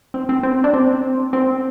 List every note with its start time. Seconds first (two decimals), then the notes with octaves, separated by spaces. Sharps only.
0.14 C4
0.29 C4
0.43 C4
0.64 D4
0.74 C4
1.33 C4